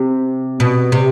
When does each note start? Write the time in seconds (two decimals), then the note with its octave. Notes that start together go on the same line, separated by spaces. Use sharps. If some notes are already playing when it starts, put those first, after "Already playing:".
Already playing: C3
0.60 B2
0.92 C3